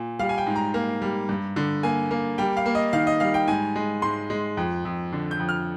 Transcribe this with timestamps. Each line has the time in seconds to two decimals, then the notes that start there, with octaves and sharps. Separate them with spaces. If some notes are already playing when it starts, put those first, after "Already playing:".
Already playing: A#2
0.19 G3 F5
0.29 G#5
0.38 G5
0.47 G#2
0.56 A#5
0.74 A#3
1.02 G3
1.29 G2
1.56 D3
1.83 A#3 G#5
2.11 A#3
2.38 G3 G5
2.57 F5
2.66 A#3
2.75 D#5
2.93 D#3 F5
3.07 D#5
3.20 G3 F5
3.34 G5
3.48 G#2 G#5
3.76 G#3
4.02 G#2 C6
4.30 G#3
4.57 F2
4.85 F2
5.12 D3
5.31 G6
5.40 F2
5.49 F6